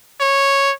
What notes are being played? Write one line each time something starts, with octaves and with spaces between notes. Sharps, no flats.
C#5